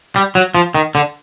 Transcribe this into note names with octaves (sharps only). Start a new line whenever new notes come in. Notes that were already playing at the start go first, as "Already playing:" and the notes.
G3
F#3
F3
D#3
D3